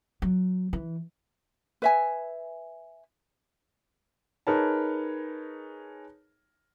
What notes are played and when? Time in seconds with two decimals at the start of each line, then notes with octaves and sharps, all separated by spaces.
0.22 F#3
0.73 E3
1.82 B4 E5 G#5
4.47 D#4 G#4 A#4 B4 C#5 A5